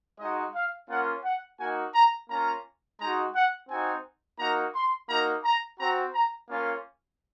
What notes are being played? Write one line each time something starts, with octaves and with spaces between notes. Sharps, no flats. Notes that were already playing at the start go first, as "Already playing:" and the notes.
G#3 D#4 F#4 D#5
F5
A#3 C#4 F4 F#5
F#5
A#3 D#4 F#4 G#5
A#5
A#3 C#4 F4 A#5
G#3 D#4 F#4 A#5
F#5
C4 D#4 F#4 G#5
A#3 D#4 F#4 A#5
C6
A#3 D#4 F#4 A#5
A#5
C4 F#4 A#5
A#5
A#3 C#4 F4 F5